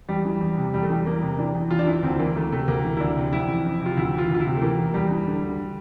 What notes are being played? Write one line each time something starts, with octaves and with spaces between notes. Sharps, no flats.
E2 G3
E3
E2
C3
E2 G3
A3
E3 G3
E2 A#3
C3
E3 D4
E2
E2 F4
D4
E3 E4
D2 C4
E3 A#3
D2 A3
C3 A3
D2 A#3
E3
E4
D2 D4
C3
F2 E4
E3
F2
C3 F4
D2 E4
E3 F4
D2
F4
E4
C3
A3
E3 A#3
E2
E2 G3
E3
D3
D2